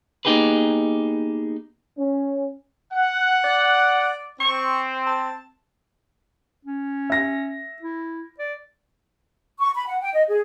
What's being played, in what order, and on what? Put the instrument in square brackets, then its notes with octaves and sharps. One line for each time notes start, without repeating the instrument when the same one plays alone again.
[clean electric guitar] A#3 B3 D#4 G4 G#4 B4
[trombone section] C#4
[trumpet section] F#5
[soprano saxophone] D5
[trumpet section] C4 [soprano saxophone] C#6
[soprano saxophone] A5
[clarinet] C#4
[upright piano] E5 A#6
[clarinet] E4
D5
[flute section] C#6
B5
F#5
G5
D#5
G#4